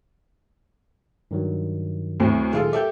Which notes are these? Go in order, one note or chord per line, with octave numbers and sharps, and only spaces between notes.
G2 D#3 F#3
D2 A2 C3
A#2 D#3 F#3 G#3 F4 A4
G4 A4 E5 D6 G6